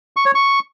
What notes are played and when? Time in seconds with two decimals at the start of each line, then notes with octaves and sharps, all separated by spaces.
0.17 C#6
0.26 C#5
0.35 C#6